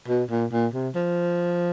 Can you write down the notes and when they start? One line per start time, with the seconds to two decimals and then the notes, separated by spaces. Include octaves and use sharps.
0.08 B2
0.30 A#2
0.52 A#2
0.73 C3
0.95 F3